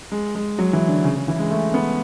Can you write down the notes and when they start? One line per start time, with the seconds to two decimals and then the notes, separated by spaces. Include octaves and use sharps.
0.12 G#3
0.35 G#3
0.59 F#3
0.73 E3
0.88 D3
1.04 C#3
1.16 C#3
1.28 E3
1.39 G#3
1.50 A3
1.74 B3